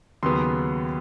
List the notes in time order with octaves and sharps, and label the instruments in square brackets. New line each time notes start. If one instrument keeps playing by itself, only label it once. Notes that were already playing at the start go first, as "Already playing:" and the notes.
[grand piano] D#2 C#3 F#3 B3 C6